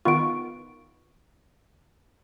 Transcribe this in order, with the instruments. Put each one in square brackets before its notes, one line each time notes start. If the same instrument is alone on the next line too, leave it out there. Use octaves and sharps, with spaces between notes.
[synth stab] D#3 B3 F4 [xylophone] C#6 D7